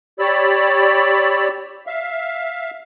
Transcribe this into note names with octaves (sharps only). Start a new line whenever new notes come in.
G4 C#5 D5 B5 E6
E5 F5